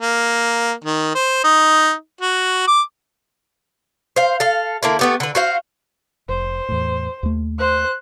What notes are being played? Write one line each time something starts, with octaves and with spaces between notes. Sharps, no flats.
A#3
D#3
C5
D#4
F#4
D6
C5 F5
A4 F5
D3 A#3 E4
A3 B3 G4
D3 B4
F#4 C5 F5
F1 C5
E2 A2
D#2 A3
C5 F#6